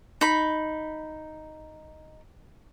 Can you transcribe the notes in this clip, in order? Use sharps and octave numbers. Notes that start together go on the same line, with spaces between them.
D#4 B5